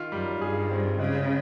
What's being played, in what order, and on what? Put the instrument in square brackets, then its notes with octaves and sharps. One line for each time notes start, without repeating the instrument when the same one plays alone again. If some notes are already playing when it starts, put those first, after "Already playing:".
Already playing: [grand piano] D#3 F4
[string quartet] F#2 [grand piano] G3
[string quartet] G2 [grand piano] G#4
[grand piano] C4
[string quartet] C#3 [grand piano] G#3